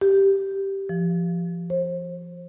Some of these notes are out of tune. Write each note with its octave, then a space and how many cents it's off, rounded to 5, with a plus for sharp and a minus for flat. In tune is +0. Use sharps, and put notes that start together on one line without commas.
G4 -5
F3 -25
C5 +30